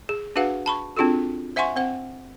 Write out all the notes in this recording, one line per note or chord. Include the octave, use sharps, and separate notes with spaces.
G#4
D4 F#4 G#4 B4 F5 F#5
A5 B5 C#6
C4 D4 F4 F#4 G#4 A4
C5 E5 F#5 G#5 C6 C#6
C4 C5 F#5